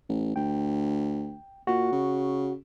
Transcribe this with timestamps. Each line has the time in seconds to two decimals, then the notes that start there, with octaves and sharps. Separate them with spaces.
0.09 A1
0.36 D2 G5
1.67 A#2 F#4
1.92 C#3